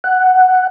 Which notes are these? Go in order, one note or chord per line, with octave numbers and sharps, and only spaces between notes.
F#5